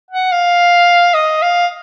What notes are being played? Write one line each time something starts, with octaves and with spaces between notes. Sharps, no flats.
F#5
F5
D#5
F5